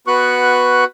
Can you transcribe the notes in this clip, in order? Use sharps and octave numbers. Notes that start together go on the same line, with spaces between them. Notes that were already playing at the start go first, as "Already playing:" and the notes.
B3 F#4 B4 C#6 F#6